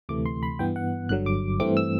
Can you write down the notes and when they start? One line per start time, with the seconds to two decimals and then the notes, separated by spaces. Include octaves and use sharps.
0.09 D2 C3 E3 A3 D6
0.26 C6
0.43 B5
0.59 G2 E3 B3 G5
0.76 F#5
1.09 G1 G2 D3 F#3 F#6
1.26 D6
1.60 G2 E3 A3 C4 D6
1.77 E6